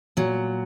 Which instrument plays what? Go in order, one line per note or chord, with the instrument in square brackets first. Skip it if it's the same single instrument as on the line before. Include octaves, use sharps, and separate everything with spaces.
[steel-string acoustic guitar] A#2 F#3